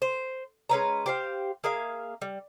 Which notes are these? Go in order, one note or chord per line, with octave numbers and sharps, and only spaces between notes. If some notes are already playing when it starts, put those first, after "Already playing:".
C5
G#3 C#4 B4 A#5
G4 C5 F5
A#3 G#4 E5 F5
G3